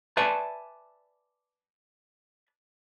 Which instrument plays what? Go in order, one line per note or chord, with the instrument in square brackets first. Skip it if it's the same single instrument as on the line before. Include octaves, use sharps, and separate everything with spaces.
[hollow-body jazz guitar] B4 D5 E5 G#5 A5